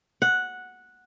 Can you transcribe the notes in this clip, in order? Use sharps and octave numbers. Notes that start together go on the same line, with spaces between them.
F#5